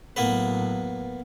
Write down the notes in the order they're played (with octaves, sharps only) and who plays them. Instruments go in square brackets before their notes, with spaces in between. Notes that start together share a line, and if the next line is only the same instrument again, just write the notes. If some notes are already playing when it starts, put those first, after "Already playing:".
[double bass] A2 F#3 [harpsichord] A#3 B3 B4